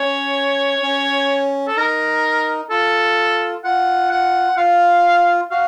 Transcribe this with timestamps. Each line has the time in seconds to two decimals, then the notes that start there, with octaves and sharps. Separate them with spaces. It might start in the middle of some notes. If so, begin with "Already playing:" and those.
Already playing: C#4 C#5
0.83 C#4
1.67 A4
1.77 D#4 A#4
2.70 F4 A4
3.64 F4 F#5
4.11 F#5
4.57 F4 F5
5.51 F#4 F5